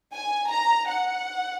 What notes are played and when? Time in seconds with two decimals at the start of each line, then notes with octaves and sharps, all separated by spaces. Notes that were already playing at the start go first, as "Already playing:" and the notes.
0.14 G#5
0.51 A#5
0.88 F#5